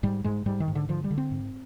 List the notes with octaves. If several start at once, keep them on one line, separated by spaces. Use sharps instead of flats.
G#2 G3
G#2 G#3
G#2 G3
D#3
G#2
D3
D3 F3
G3
D3
C4
G#2